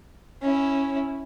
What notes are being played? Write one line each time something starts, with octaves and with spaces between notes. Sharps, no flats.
C#4 E4